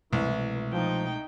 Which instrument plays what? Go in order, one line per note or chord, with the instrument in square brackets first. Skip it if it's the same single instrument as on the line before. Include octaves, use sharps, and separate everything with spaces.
[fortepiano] C2 [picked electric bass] B2 G#3 A3 [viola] E3
[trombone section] F3 [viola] D#4 G5